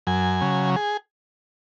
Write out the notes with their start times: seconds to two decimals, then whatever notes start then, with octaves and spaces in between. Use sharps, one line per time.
0.07 F#2 G#5
0.41 C#3 F#3
0.76 G#4